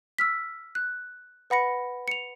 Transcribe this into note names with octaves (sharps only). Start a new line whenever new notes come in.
E6 F6 B6
F#6
B4 F#5 B5 A#6 C#7
C#7 F7